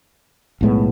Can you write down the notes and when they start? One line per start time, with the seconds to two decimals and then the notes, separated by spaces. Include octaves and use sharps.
0.61 B1 A2 G#3 B3